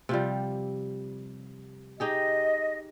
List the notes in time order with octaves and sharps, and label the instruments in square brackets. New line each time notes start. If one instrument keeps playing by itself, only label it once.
[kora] C3 F3 G3
[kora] D#4 G4 G#4 [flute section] D#5